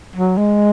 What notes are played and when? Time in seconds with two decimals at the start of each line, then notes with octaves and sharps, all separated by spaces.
0.16 F#3
0.37 G#3